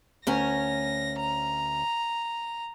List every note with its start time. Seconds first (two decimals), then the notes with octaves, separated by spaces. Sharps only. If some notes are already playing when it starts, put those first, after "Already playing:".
0.27 D2 C#4 A#4 A#6
1.20 A#5